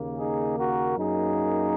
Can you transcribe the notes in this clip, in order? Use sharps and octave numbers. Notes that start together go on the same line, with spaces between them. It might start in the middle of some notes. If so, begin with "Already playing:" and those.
Already playing: D#2 C#3 A#3
D#4 G#4
F#4 A#4
F#2 F#3 A#3 D#4 G#4